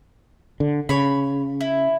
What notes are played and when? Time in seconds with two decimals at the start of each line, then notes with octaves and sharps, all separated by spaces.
0.60 D3
0.89 C#3 C#5 B5
1.61 E4